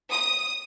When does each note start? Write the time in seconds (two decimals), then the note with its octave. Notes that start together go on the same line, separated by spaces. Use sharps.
0.11 D#6